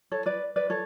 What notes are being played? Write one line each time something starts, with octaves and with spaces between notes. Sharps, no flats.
A4 C#5
B4 D5
B4 D5
A4 C#5